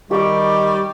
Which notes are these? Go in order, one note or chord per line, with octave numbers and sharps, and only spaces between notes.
D#3 G3 G4 C#6 D6